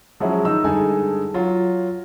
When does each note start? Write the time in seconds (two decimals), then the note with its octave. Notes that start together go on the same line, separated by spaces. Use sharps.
0.20 F3 F#3 G#3 C#4 E4
0.45 D#3 D#4 E6
0.64 G2 D3 G#3 D#4 A4 G#5
1.34 F#3 F4